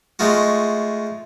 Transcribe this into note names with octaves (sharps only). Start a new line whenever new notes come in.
G#3 A3 D#4 F4 F#4